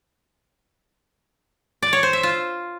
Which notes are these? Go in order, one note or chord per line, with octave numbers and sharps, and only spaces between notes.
D5
C#5
C5
E5
F4